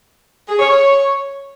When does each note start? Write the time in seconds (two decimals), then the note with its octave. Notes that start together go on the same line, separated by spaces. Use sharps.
0.48 G#4
0.59 C#5
0.69 C#5